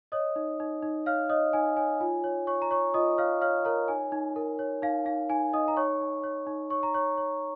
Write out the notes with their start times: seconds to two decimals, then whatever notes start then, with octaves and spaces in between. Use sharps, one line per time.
0.12 C#5 D#5 D#6
0.36 D#4
0.60 D#4
0.82 D#4
1.06 C#5 F5 F6
1.30 C#5 D#5 D#6
1.53 D#4 G#5
1.77 C#5 G#5
2.00 F4 G#5
2.24 C#5
2.47 C#5 C#6
2.62 A#5
2.71 C#5 C#6
2.94 F4 D#5 D#6
3.18 C#5 F5 F6
3.41 C#5 F5 F6
3.65 A#4 C#5 A#5
3.88 D#4 G#5
4.12 D#4
4.36 A#4
4.59 C#5
4.82 D#4 F5
5.06 D#4 F5
5.30 D#4 G#5
5.53 D#4 D#5 D#6
5.68 A#5
5.77 D#4 C#5 C#6
6.01 D#4
6.24 C#5
6.47 D#4
6.70 C#5 C#6
6.83 A#5
6.94 C#5 C#6
7.18 C#5